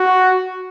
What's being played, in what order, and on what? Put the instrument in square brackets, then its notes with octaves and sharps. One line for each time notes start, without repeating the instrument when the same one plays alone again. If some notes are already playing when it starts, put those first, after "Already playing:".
Already playing: [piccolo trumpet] F#4